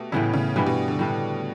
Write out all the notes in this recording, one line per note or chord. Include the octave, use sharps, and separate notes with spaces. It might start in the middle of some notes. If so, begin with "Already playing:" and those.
Already playing: B2 A3 G4
A2 C#3 E3 B3 E4
C#3
G2 B2 E3 G3 B3
B2
D3
A2 G3 D4